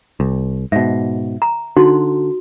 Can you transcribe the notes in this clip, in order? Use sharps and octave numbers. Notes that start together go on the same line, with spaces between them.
C2
G#2 B2 E5
A#5
D3 D#4 F#4 C6